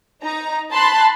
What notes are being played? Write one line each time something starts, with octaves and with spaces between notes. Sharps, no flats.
D#4 A#5
A5 B5 C6 F#6